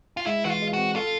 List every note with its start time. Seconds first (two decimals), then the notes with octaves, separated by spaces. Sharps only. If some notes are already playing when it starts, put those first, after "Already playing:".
0.17 F4
0.26 G#3 E4
0.44 E3 F#4
0.50 F4
0.62 G#3
0.73 C4 F#4
0.96 F4 A4